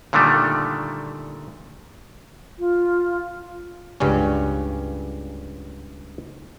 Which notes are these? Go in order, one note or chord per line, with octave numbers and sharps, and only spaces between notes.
A#2 D3 D#3 G3 A3
F4
C#2 G2 C#3 G3 C#4